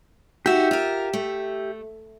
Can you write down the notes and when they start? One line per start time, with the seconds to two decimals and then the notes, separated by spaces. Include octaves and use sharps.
0.46 D#4 F#4 G4 E5
0.71 F4 A#4
1.13 A3